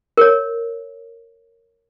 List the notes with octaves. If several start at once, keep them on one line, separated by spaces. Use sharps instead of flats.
A#4 C#5